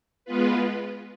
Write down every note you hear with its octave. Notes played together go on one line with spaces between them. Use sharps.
G#3 B3 F4 B4